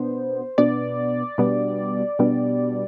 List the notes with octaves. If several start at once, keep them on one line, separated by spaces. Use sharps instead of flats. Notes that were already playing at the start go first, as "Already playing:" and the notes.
Already playing: B2 B3 D4 C5
B2 B3 D4 D5
B2 G3 B3 D4
B2 G3 B3 D4